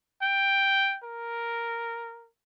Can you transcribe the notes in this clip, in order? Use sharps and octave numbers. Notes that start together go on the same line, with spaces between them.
G5
A#4